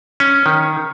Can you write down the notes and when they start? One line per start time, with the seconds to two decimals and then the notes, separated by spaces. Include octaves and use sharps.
0.20 C#4
0.46 D#3